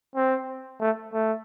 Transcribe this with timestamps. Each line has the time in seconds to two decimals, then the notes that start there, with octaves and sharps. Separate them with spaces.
0.15 C4
0.81 A3
1.13 A3